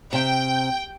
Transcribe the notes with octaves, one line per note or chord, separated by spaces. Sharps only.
C3 G5